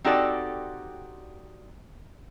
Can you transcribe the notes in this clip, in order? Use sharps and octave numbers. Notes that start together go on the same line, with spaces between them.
C4 D#4 F#4 G4 A4 D5